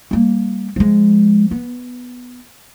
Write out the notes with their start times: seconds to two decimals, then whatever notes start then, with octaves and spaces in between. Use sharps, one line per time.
0.11 G3 A#3
0.76 F3 G#3
1.51 B3